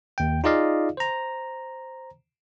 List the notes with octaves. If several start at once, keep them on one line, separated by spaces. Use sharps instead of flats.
D#2 G5
D#4 F4 G#4 D5 D#5 F5
C5 A#5